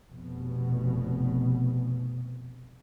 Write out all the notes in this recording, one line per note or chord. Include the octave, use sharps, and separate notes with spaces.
F1 B2